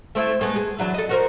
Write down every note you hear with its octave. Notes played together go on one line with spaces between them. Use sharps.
A3 C4 E4
G#3 A3 B3
G#4
E3 F#3 D4
A4 D#5
F#4 A#4 C5